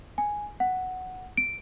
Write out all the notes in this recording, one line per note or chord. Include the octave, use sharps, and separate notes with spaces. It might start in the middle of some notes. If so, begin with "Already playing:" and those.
G#5
F#5
D7